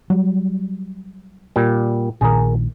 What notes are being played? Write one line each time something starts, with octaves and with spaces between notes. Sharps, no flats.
F#3 G3
A#2 G3
A#1 A#2 D#3 G#4 A#4